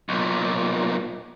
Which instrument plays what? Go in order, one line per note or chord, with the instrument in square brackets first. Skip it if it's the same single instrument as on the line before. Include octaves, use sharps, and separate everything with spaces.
[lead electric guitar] B1 A#2